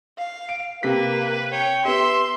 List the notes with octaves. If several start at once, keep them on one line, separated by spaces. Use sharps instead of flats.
F5
D7
C3 A#3 G4 B4 B6
C#5 G5
B3 G4 E5 C6